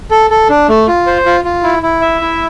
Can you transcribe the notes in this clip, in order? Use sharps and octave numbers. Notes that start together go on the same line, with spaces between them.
A4
A4
D4
A3
F4
C5
F4
F4
E4
E4
E5
E4